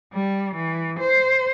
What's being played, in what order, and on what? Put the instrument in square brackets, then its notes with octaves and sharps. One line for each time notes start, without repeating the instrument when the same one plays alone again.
[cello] G3
E3
C5